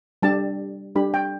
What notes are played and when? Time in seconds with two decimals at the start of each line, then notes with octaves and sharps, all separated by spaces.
0.22 G3 D4 G4 A5
0.96 G3 D4 G4 B5
1.14 G5